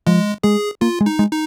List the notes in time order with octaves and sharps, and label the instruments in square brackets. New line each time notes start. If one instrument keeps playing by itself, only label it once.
[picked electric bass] F3 [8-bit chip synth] G#3
[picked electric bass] G#3 [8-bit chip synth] G#4
[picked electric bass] A#3 [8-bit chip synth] F4
[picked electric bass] G#3
[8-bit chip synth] D#4
[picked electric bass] G#3
[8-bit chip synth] D#4